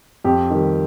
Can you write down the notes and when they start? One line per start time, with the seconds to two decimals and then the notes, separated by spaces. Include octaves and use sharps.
0.24 F2 G4
0.50 D#3 G3